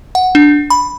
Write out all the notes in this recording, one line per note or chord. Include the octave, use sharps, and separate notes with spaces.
F#5
D4
B5